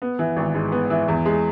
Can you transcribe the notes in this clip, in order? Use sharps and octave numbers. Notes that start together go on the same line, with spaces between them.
B3
E3
G#1
G#2
B3
E3
E2
G#3